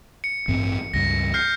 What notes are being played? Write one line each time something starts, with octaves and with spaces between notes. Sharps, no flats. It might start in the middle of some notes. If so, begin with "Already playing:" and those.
C#7
A1 G2 C4
C#2 G2 A#6
F6 G6 C7